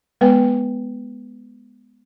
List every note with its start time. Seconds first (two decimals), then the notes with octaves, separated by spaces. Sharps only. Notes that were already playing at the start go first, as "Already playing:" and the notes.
0.21 G#3 B3 B4 G5